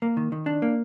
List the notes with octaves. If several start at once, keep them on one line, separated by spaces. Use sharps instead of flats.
A#3
D#3
D#3
D4
A#3